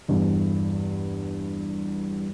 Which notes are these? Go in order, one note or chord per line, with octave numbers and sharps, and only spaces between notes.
E2 G2